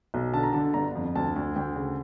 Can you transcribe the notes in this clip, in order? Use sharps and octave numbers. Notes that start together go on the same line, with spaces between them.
B1
D3 A5
A#5
D3 A5
G1 A#5
F2
D2 A5
D2
D2 G5
C#3